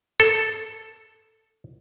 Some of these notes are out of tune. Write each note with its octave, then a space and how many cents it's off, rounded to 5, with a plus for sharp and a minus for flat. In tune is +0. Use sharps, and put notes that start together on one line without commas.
A4 +0